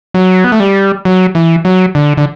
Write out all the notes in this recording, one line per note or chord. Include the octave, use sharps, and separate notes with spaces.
F#3
B3
A3
G3
F#3
E3
F#3
D3
D3